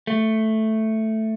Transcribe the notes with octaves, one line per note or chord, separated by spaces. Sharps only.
A3